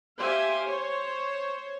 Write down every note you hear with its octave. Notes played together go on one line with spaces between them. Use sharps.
G4 C5 E5 F5 G#5
C5 C#5